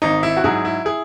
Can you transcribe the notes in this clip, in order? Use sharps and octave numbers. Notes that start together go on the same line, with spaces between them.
G#1 D#4
E4
F#4
G#2 F#3 E4 G#4
E4
E4 G#4